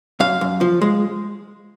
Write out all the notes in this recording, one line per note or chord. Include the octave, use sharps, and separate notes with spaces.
F#2 F5
F#2
F3
G#3